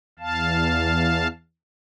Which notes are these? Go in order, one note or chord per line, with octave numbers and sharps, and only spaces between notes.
E2 F5 A5